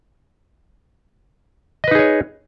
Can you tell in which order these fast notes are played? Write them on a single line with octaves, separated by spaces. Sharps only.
D#5 B4 D#4 G#4 C#5